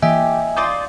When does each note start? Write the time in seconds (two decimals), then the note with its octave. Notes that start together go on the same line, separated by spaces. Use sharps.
0.02 E3 A#3 G4 D#5 E5 G#5
0.56 D#4 F4 D5